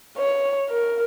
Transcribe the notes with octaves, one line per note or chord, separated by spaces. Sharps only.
C#5
A#4